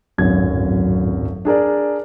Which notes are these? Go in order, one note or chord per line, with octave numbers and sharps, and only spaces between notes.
D1 G#1 F#2 F#4 G#6
D4 G#4 A#4 D5